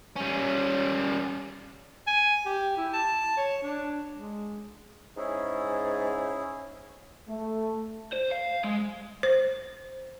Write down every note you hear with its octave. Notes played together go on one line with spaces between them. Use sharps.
G3 C#4
G#5
G4
E4
A5
C#5
D4
G#3
G#2 C#4 E4 G#4
A3
C5
F5
G#3
C5